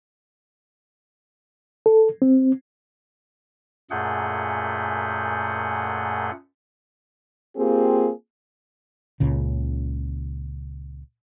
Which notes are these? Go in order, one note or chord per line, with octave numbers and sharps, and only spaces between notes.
A4
C4
F#2 A#2 A3 G#4 F#5 G6
A#3 C4 F4 G4 G#4
C#2 A#2 C#3